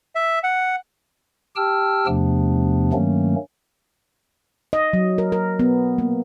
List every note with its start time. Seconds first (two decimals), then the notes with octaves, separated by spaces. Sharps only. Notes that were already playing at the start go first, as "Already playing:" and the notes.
0.15 E5
0.44 F#5
1.56 G4 G5 A5 E6 F6
2.07 E2 C3 F3 A3 B3 D4
2.93 G2 D#3 F#3 A3 A#3 C#4
4.73 D#5
4.93 F#3
5.18 A#4
5.32 A#4
5.59 B3
5.98 A#3